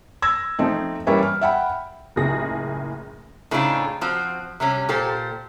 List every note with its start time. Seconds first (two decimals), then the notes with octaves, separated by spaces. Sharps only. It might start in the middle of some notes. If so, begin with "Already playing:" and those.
0.22 E6 G#6 A#6
0.59 F3 A3 C4 D#4
1.07 E3 G3 A#3 C#4 E4 B4
1.23 F6
1.41 E5 F#5 G5 B5
2.16 F#1 C#2 A2 G4 G#4 A#6
3.51 A2 C#3 C4 D4 D#4 F4
4.01 F3 C4 F#4
4.60 C3 G3 C#4
4.89 A#2 G4 A4 C5